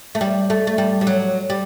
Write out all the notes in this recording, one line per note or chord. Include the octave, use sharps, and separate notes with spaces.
A3
G3
A3
A3
G3
G3
F#3
G3